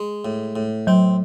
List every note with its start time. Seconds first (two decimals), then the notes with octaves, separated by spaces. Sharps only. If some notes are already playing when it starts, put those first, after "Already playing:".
Already playing: G#3
0.25 A2
0.56 A2
0.87 F#3 C4